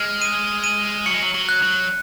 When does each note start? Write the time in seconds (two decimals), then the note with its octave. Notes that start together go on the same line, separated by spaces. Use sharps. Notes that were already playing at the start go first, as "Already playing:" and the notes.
Already playing: G#3 F6
0.22 D#7
0.64 D#7
1.06 F#3 C#7
1.14 G#3
1.21 F#3
1.34 F#3
1.49 F#6
1.62 F#3